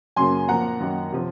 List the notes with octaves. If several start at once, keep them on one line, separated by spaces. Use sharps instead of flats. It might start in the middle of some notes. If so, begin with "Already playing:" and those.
F#2 C#3 F#3 A#3 G#5 C6
A#2 F3 A#3 F#5 A#5
F#2 D#3 A#3
C3 F3